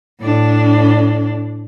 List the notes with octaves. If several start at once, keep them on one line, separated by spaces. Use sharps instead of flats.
A2 D4